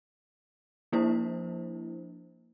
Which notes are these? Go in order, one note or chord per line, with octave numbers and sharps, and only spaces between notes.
F3 A#3 D4 E4 C5